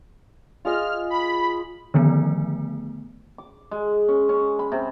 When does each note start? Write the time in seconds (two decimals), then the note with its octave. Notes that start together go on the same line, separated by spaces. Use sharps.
0.65 F4 G#4 D#5 F6
1.10 B5
1.94 D3 D#3 F3 A3 B3
3.38 D6
3.71 G#3
4.08 C#4
4.29 C#4
4.59 B5
4.72 C3